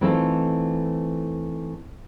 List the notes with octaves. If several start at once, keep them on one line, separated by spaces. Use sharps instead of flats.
E3 A3 C4 D#4 F4 A4